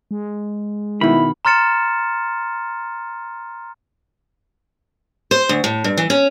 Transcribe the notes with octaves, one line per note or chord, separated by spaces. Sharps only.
G#3
B2 D#3 E4 B5
A#5 C6 F6 A6 C#7 E7
C5
D2
A2
G2
E3
C#4